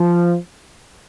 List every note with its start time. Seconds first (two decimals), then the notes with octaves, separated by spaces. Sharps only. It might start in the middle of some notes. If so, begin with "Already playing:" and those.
Already playing: F3